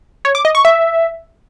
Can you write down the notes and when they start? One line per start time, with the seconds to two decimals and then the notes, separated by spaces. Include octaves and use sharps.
0.25 C#5
0.35 D6
0.45 D#5
0.55 C#6
0.65 E5